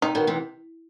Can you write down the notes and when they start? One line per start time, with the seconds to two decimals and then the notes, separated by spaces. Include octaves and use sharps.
0.02 C3 D#4
0.15 B2 D#3
0.27 C3 E3